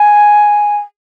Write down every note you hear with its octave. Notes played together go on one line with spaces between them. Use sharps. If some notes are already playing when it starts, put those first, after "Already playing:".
Already playing: G#5